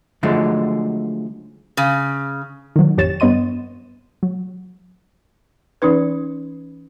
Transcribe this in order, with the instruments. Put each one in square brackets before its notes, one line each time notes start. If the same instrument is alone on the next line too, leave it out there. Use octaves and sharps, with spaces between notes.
[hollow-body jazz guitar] D3 F3 F#3 G#3 A3
[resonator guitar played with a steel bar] C#3
[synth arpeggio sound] D#3 F#3
A1 F2 G4 C#5 A6 E7
G2 B3 C#5 D#5 C6 D#7
F#3
[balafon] E3 C#4 D#4 B4